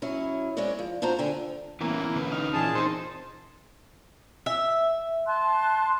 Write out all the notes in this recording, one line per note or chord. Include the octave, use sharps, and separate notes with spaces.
F#3 C#4 E4
G#3 C4 C#4 C#5 D5
F3
D4 F4 F#4 C5 A#5
D3 G5 G#5
E3 A#3 B3 C#4 E4
D3 C#4 B4
D#4 F6
A#2 E3 C#4 G#4 A5
C4 D#4 C5
E5
A5 C6 F#6